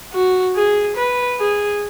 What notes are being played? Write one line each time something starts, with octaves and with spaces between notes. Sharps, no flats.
F#4
G#4
B4
G#4